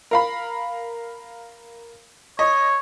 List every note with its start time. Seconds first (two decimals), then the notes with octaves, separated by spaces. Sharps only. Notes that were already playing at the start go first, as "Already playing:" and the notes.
0.11 A#4 F5 B5
2.39 C#5 D#5